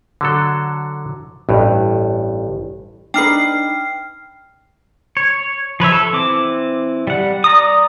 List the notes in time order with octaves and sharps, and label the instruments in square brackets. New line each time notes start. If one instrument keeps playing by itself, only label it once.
[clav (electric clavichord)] D3 F#3 A4
A1 G2
[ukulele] D4 D#4 B4 [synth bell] G5 F6 C7
[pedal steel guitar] C#5
F3 B4 C#5 E5
A4
E3 C4 D6
G3 F#5
D5 A#5 D#6